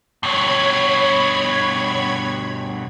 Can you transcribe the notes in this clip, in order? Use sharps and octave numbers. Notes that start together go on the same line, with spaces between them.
G2 B2 C#5 B5 G#6